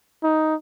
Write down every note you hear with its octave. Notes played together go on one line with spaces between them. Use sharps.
D#4